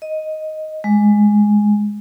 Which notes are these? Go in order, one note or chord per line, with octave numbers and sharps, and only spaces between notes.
D#5
G#3